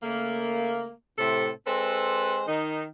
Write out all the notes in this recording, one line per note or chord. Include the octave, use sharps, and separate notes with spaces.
C#3 A3 A#3
A2 C3 C4 A4 C5
G#3 C4 A4 B4 C5
D#3 D#4